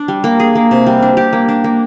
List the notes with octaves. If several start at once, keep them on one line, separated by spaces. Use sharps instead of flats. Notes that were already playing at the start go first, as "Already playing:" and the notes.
Already playing: D4
G3
A#3
G#4
A#3
C3
G3
D4
G4
A#3
D4
A#3